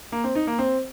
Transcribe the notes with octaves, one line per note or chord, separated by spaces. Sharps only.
A#3
C4
D#4
A#3
C4